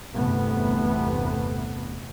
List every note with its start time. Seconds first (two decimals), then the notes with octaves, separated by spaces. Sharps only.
0.16 G1 E2 C3 A3 B3